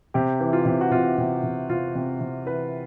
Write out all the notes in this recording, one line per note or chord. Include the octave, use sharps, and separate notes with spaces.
C3 G4
E3
F4
C3
F#4
C3 F4
C3
C3
C3 F4
C3
C3
E3 B4